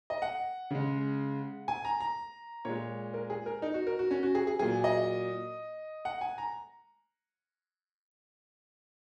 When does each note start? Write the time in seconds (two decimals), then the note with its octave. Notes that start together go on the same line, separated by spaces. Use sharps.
0.10 D#5
0.22 F#5
0.70 C#3 G#3
1.68 G#5
1.85 A#5
2.00 A#5
2.65 A#2 G#3 C#5
3.14 A#4
3.30 G#4
3.46 A#4
3.62 D#4
3.74 F#4
3.87 A#4
3.99 F#4
4.11 C#4
4.23 F#4
4.35 G#4
4.47 G#4
4.59 A#2 F#3 G#4
4.84 D#5
6.05 F#5
6.21 G#5
6.38 A#5